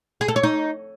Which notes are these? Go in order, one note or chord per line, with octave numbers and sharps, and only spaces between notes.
G#4
A4
C#5
D#4